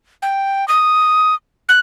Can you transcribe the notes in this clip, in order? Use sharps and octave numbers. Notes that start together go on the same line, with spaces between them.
G5
D#6
F#6